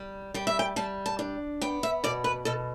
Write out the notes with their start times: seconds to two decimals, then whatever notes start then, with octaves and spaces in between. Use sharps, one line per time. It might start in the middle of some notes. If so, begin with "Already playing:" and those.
Already playing: G3
0.34 G3 G5
0.47 E5
0.59 G5
0.76 G3 A5
1.06 A5
1.19 D4
1.61 B3 G5
1.83 E5
2.04 B2 D5
2.24 B4
2.45 B2 A4